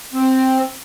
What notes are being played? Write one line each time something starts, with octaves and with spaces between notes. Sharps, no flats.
C4